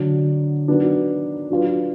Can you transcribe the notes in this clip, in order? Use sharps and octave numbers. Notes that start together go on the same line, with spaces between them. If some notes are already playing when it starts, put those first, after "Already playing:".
Already playing: D3 F#3 D4
D#3 F#3 B3 D4
F#3 D4 F4 B4